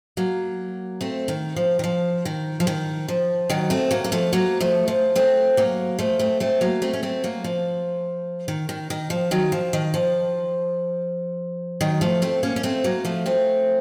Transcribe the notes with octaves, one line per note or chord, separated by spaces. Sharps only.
F#3 A#3
A3 C4
D#3
F3
D#3
F3
D#3
F3
D#3
F3
D#3 F#3
A3 C4
F#3 A#3
A#3
F3 A3
F#3 A#3
F3 A3
F3
A3 C4
F#3 A#3
F3 A3
A3 C4
A3 C4
F#3 A#3
A3 C4
C#4
A3 C4
F#3 A#3
F3
D#3
D#3
D#3
F3
D#3 F#3
F3
D#3
F3
D#3 F#3
F3 A3
A3 C4
A#3 C#4
C#4
A3 C4
F#3 A#3
F3 A3
A3 C4